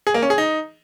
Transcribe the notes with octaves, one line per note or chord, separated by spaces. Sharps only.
G#4
A#3
C#4
G#4
D#4